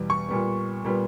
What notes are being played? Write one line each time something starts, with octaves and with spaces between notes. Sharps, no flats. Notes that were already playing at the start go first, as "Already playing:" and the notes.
Already playing: E2 B2 G3
C#6
A#2 G3 B3
A#2 G3 B3